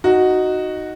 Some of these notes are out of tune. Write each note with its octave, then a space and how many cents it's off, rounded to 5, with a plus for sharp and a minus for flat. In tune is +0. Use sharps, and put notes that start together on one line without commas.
D#4 +0 F#4 +0